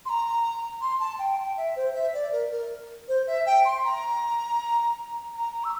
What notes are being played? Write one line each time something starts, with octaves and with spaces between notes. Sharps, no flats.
C6
A#5
C6
A5
G5
G5
E5
C5
E5
D5
A#4
A#4
C5
E5
G5
C6
A#5
A#5
A#5
E6